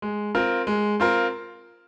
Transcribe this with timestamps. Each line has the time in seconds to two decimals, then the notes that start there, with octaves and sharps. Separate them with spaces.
0.02 G#3
0.35 C4 F4 A#4
0.67 G#3
1.00 C4 F4 A#4